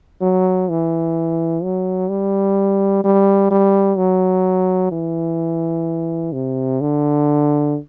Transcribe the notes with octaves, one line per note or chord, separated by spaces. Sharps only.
F#3
E3
F#3
G3
G3
G3
F#3
E3
C3
D3